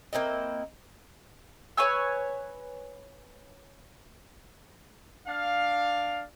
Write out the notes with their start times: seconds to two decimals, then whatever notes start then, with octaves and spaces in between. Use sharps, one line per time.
0.13 A#3 C4 E4 D#5
1.77 B4 C#5 G#5 E6
5.27 D4 D5 F5